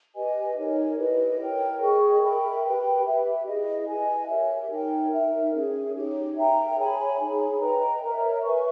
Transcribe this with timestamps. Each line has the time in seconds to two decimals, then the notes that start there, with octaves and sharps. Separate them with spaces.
0.15 G4 B4 D#5 G#5
0.56 D#4 A#4 C#5
0.98 E4 G4 B4 D#5
1.39 A#4 C#5 G5
1.80 G#4 D#5 G5 C#6
2.21 A#4 E5 G5 B5
2.63 G4 B4 G5 B5
3.04 G4 B4 E5
3.46 E4 G#4 D#5
3.87 B4 D#5 G#5
4.28 G4 A#4 C#5 E5
4.70 D#4 A#4 C#5 G5
5.12 D#4 A#4 E5
5.53 C#4 G#4 C#5
5.94 D#4 G4 C#5
6.35 A#4 E5 G5 A#5
6.76 G#4 C#5 G#5 B5
7.17 D#4 G#4 C#5
7.59 B4 D#5 G5 A#5
8.01 A#4 C#5 E5 A#5
8.42 B4 E5 G#5 C#6